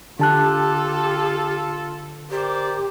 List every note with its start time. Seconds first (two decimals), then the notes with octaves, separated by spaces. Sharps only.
0.19 D3 F4 G4 A4 A5 F#6
2.30 G4 A#4 C5 D5